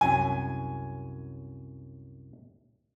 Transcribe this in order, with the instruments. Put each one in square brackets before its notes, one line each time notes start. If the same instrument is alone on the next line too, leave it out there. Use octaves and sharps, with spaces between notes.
[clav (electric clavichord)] C2 F#2 F#3 [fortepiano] G#5